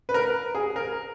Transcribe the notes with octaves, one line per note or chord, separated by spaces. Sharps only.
B4
A#4
G#4
A#4